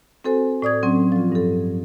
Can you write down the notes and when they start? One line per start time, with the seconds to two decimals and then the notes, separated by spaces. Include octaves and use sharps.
0.24 C4 F#4 A4 C5 G#5
0.62 A2 D5 D#6 G#6
0.83 F#3 C4 C#4
1.12 F3 F4
1.32 G2 A4